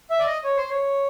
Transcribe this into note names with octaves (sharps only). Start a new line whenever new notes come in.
E5
D5
D#5
C#5
C5
C#5